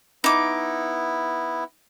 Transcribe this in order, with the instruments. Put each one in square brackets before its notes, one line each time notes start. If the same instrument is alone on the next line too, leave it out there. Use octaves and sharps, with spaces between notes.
[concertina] B3 E4 [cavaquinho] D#4 D6